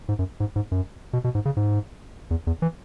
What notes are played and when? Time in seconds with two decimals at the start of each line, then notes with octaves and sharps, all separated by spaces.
0.09 G#2
0.19 F#2
0.40 G#2
0.56 G#2
0.72 F#2
1.13 B2
1.24 B2
1.35 G#2
1.45 C#3
1.57 G#2
2.31 E2
2.47 E2
2.62 E3